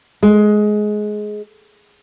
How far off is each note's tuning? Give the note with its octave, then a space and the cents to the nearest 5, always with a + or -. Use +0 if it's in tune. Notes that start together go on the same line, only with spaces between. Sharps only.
G#3 +15